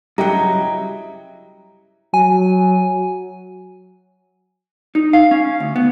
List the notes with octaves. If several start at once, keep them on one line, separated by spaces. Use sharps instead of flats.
G2 C#3 F#3 E4 G4 D#5 G5 A#5
F#3 G#5
D#4
F5
C#4
D2
B3